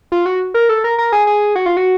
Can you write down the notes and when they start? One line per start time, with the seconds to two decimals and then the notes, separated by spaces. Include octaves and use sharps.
0.12 F4
0.26 F#4
0.54 A#4
0.69 A4
0.84 A#4
0.98 A#4
1.12 G#4
1.27 G#4
1.55 F#4
1.66 F4
1.77 F#4